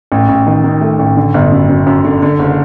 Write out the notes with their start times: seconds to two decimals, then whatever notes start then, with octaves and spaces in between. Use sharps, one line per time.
0.12 A1
0.29 A1
0.47 D#3
0.64 D#3
0.81 A3
0.99 A1
1.17 D3
1.34 G1
1.52 F#2
1.69 F#2
1.87 F#2
2.05 D3
2.22 D3
2.39 F#1